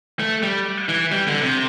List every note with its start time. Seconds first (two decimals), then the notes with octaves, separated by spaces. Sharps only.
0.20 A3
0.43 G3
0.89 E3
1.12 G3
1.27 D3
1.43 C3